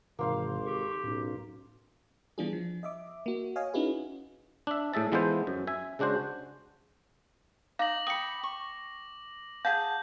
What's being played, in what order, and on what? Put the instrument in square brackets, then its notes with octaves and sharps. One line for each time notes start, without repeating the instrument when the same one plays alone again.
[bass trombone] G#1 [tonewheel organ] G#2 C3 E3 [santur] A#3 C5 F5
[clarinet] G4 [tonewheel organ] A4 C#6
[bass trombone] B1 [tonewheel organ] A2 C#4
[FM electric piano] E3 G3 B3 D4 F4 G#4
F3
D#5 E5 D6
A#3 F#4
C#5 D#5 F5 G#5
C#4 D#4 E4 F#4 G#4 B4
[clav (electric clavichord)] D4 E5
A2 G#4 E5 A5
E3 G#3 B3 F4 A4 C5
F#2
E5 G#5
C#3 G#3 D4 F#4 C5
[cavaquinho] D#4 D#5 [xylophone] F5 [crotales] D6 A#6 F#7
[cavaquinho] G5 B5 [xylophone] D#6 C#7
[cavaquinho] C#6
[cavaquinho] G#4 A5 [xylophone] F5 F#5 [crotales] G6